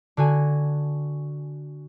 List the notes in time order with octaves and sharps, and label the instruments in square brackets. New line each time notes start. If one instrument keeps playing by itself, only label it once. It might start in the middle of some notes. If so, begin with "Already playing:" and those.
[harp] D3 F#4 G#5